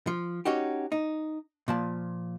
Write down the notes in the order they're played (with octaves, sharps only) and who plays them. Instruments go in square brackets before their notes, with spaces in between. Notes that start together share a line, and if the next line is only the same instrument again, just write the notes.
[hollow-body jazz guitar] F3
C#4 D#4 F#4 G4
D#4
A#2 F3 A5